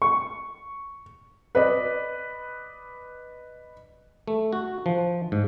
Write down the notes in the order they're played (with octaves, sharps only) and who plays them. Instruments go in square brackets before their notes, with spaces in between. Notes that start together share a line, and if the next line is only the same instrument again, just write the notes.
[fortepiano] C#6
[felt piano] B4 D5 D#5
[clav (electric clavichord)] A3
F#4
F3
G#2